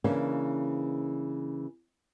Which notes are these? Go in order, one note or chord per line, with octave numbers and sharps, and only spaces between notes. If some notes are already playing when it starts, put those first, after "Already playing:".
C#3 E3 A#3 C#4 D4